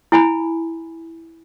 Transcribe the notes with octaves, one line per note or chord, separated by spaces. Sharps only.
E4 G#5 B5